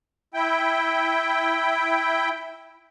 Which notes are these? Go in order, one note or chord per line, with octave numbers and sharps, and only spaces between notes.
E4 G5